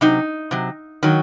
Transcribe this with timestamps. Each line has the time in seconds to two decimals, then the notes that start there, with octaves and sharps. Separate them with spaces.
0.01 C3 F#3 D#4
0.51 C3 F#3
1.03 D#3 F#3